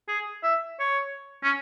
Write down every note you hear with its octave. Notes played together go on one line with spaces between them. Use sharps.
G#4
E5
C#5
C#4